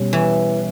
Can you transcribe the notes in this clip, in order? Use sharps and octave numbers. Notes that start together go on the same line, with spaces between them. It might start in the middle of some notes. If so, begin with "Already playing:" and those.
Already playing: B2 G3 C#4
E3